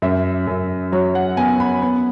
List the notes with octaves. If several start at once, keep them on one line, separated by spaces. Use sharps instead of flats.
F#2 E5
F#2
F#3 C#5
F#5
B3 G#5
B5
B3